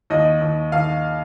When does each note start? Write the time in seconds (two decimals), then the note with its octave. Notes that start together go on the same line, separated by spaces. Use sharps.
0.10 D#2 D#5
0.41 D#2
0.72 D#2 F5